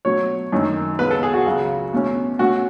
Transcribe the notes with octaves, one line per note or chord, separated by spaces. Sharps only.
B2 F#3 A3 C#5
F#2 D#3 A3 C#4
C#2 B2 G#3 B3 B4
A4
G#4
F#4
C#2 C#3 F#3
E2 B2 A3 C#4
B2 A3 C#4 F#4